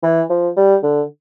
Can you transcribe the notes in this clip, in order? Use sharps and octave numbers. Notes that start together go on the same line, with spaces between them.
E3
F3
G3
D3